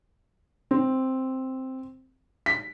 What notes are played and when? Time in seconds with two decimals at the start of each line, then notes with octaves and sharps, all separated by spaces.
0.71 C4
2.46 B6